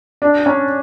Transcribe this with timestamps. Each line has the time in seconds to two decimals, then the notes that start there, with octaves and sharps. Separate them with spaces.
0.22 D4
0.46 C#4